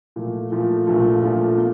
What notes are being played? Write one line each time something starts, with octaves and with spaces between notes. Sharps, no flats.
A#2 F3 A3
A#2 F3 A3
A#1 A#2 F3 A3
A#1 A#2 F3 A3
A#3